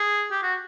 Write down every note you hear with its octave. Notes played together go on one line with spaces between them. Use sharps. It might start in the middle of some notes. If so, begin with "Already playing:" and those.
Already playing: G#4
G4
F#4